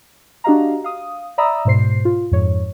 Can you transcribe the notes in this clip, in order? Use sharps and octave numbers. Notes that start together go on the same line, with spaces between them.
D4 F#4 G4 D#5 F5 A#5
F5 D#6
D5 E5 A#5 B5 D#6 E6
G#2 B2 C5 C7
F4
F2 G#2 C#5